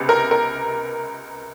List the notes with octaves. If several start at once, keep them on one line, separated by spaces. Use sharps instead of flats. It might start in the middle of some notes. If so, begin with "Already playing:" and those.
Already playing: C#2 C3 B3
A#4
A#4